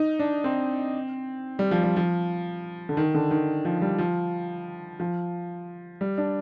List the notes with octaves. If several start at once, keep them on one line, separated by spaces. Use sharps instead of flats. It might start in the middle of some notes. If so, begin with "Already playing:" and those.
Already playing: D#4
D4
C4
G3
F3
G3
F3
D3
D#3
D3
D#3
F3
G3
F3
F3
G3
D4